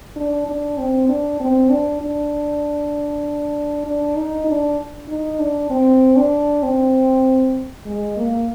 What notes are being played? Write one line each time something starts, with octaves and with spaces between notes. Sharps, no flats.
D4
D4
C4
D4
C4
D4
D4
D4
D#4
D4
D#4
D4
C4
D4
C4
G#3
A#3